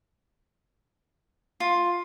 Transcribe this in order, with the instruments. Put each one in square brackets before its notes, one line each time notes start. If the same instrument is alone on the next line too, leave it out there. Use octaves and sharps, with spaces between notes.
[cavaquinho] F4